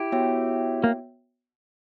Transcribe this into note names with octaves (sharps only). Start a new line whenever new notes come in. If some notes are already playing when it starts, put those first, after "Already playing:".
Already playing: E4 G4
B3 F#4 C#5 E5 G5
A#3